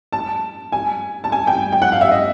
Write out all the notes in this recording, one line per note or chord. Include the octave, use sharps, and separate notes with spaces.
A5
G#5
A5
G#5
G5
G5
F#5
F5
E5
D#5